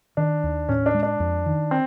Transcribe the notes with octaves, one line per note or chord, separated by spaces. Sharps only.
D#3 D4
D#2
A2 C#4
D4
G#3
D4
F2
D#3
C4